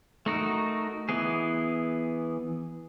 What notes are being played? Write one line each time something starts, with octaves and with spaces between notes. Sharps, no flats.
A3 D#4 F#4 A#4
E3 B3 G#4